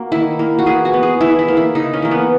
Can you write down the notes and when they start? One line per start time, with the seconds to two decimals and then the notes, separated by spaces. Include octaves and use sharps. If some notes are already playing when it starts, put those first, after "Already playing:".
Already playing: A#3 F#4
0.12 D#3 E4
0.39 A#3
0.59 F#4
0.66 E3 G#4
0.85 F#4
0.94 B3
1.03 G#4
1.21 E3 E4
1.39 E4
1.48 A#3
1.57 E4
1.75 C#3 D#4
1.93 C#4
2.02 E3 A#3
2.11 B3